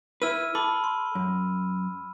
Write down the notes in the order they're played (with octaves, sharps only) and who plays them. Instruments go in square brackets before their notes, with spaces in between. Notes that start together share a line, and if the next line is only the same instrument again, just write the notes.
[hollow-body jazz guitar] E4 B4 [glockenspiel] E6 F6 D#7
[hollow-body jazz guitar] A4 [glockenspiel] B5 D6
[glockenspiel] C6
[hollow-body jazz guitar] F#2